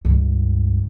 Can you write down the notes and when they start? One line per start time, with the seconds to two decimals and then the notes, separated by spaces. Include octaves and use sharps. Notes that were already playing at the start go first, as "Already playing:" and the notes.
0.05 C#2 G2